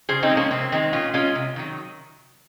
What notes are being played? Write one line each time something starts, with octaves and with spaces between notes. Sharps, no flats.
C#3 G#4 C5
C4 D#4
F3 G#3
A#3 C#4
C3 C4
D#3 G#3 C4
A#2 C#4 F4
G#3 C#4 F4
C3
D#3 F#3